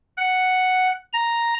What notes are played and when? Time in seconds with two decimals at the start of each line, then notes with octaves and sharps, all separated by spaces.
0.17 F#5
1.13 A#5